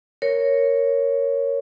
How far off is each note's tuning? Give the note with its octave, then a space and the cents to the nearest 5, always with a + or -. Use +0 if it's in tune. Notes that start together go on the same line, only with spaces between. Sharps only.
A#4 +0 C#5 +0